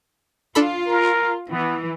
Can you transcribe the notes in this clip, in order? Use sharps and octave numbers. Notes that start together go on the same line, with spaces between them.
D4 F4 A4 B5
A#4
E3 B3